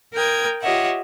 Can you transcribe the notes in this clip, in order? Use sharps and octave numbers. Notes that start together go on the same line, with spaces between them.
A#4 G5 D#6 G#6
F4 G4 C#5 D#5 E5 F#5